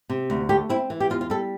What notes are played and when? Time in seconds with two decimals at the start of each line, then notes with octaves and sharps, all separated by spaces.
0.10 C3
0.30 D2
0.49 A3 G4
0.69 C4 E4
0.90 E3
1.00 G4
1.10 E2 F4
1.21 F4
1.30 G3 A4